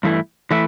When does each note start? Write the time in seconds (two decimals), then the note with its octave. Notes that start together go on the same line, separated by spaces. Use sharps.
0.03 G2 E3 A3 E4
0.51 E3 A3 E4